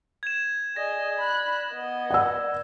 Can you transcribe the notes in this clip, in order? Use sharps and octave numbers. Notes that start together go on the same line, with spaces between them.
G#6 E7
G#4 D5 D#5 A#6
B5 F#6
B3 D#5
D5 F#5 E6